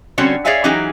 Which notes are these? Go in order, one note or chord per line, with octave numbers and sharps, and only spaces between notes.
D3 G3 C4 C#4 F#4 C#5
G#4 C#5 D5 E5 F5 G#5
E3 F#3 C#4 D#4 G4 G#4